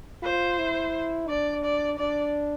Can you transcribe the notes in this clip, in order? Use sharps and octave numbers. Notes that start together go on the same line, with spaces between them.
F4 C5
E4
D4 D5
D5
D4 D5